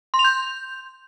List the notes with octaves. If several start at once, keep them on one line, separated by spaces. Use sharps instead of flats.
C6
F7
G6